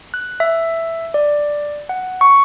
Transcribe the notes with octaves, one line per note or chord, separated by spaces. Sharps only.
F#6
E5
D5
F#5
C#6